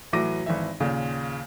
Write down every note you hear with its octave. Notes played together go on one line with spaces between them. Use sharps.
A2 E3 F#3 D6 A#6 D#7
G#1 E3 E5
D#2 A#2 C#3